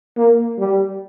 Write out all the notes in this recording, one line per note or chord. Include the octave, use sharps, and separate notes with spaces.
A#3
G3